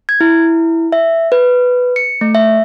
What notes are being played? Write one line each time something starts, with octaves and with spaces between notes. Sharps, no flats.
G#6
E4
E5
B4
C#7
A3
E5